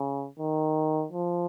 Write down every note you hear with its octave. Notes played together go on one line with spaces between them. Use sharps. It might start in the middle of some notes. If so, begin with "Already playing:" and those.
Already playing: C#3
D#3
F3